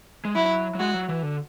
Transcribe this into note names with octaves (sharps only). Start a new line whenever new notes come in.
G#3
F#3 E4
F#3
G#3 F#4
F#3
E3
D3